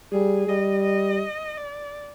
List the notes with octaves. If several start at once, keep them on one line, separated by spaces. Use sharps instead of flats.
G3 G#4
G3 D#5
D#5
D5